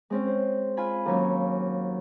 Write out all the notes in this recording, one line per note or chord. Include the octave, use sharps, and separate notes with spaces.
G#3 C4 C#4
C5
F4 G#5 B5
D#2 F#3 C#4